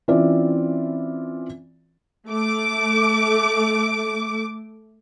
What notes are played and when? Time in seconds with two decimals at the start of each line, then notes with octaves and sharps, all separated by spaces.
0.08 E3 C4 C#4 F4 D5 E5
2.27 A3 D6